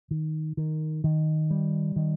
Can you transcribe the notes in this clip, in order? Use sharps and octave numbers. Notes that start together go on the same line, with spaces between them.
D#3
D#3
D#3
G3
D#3